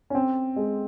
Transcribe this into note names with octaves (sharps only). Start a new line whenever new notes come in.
C#4
C4
G#3